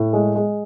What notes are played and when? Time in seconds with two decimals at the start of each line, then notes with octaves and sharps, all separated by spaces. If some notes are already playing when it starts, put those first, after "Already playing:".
Already playing: A2
0.13 G#3
0.35 G#3